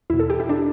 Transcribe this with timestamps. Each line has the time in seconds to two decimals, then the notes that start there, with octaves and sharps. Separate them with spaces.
0.10 E2 E4
0.14 B2
0.20 A4
0.30 G4
0.40 E4
0.49 D4